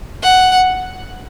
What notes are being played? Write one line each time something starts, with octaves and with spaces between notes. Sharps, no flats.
F#5